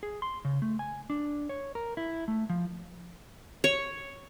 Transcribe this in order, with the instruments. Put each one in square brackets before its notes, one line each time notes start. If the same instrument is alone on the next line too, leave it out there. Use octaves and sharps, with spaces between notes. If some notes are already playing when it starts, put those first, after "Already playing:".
[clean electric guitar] G#4
C6
C#3
A3
G#5
D4
C#5
A#4
E4
A3
F3
[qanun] C#5